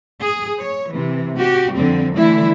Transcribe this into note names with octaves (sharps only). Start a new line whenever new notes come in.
G#4
C#5
C3 E3
F#4 G4
F2 D3 G3 C4
D3 E3 G3 A3 E4